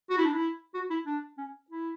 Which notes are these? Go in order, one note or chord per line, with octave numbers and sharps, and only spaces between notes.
F#4
E4
D4
E4
F#4
E4
D4
C#4
E4